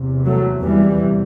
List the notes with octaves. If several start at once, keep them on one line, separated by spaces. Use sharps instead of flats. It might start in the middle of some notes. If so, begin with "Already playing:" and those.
Already playing: E2 C3
F#3 A3
E2 C3 E3 G3